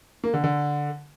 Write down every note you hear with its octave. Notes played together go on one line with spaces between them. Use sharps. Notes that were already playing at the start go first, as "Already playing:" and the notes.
A#3
D3
D3